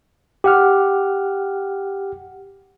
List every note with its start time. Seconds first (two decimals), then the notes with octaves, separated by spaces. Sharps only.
0.44 G4 F#5 F6